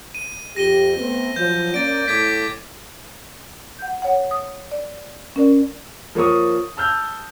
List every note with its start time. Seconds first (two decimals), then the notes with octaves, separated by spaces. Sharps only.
0.15 D#7
0.56 F2 G4 A#6 D#7 G7
0.97 A3 B3 C4
1.36 F3 F#3 G6
1.74 A#3 C#4 D5 A6 D7
2.08 A2 A3 D6 G#6 B6
3.79 F#5 G6
4.02 C#5 F#5
4.31 D#6
4.72 D5
5.36 C#4 A#4 D5
6.15 F3 A#3 C#5 C#6 D#6
6.77 A5 E6 F6 G6